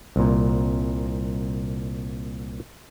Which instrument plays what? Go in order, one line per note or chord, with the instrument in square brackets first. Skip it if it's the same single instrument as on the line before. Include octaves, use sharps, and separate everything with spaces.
[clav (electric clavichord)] C2 A#2